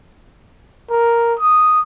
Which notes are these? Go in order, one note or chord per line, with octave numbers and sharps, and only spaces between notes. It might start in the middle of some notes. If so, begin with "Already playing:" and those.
A#4
D#6